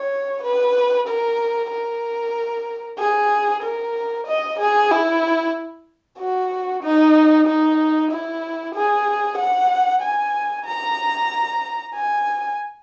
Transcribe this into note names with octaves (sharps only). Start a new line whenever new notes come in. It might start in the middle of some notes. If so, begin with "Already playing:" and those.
Already playing: C#5
B4
A#4
A#4
G#4
A#4
D#5
G#4
E4
F#4
D#4
D#4
E4
G#4
F#5
G#5
A#5
G#5